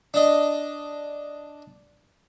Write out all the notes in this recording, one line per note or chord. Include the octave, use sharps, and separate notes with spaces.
D4 D#5